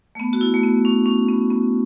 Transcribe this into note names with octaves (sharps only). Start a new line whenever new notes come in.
A3
B3
F#4
E4
A3
B3
C#4
C#4
B3
B3